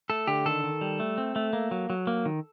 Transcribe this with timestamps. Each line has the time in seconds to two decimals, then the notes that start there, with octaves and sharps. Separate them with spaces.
0.10 A3 A4
0.27 D3 G4
0.46 D#3 A4
0.64 D#3
0.81 G3
1.00 A3
1.18 C4
1.36 A3
1.53 A#3
1.71 F#3
1.90 F#3
2.07 A#3
2.26 D#3